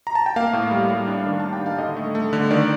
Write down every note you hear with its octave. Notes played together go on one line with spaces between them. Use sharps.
A#5
A5
G5
A#3 F5
A2
G3
G3
D4
D#3
D4 A5
G5
D#3 F5
D3 D#5
A3
A3
D3
D#3 D5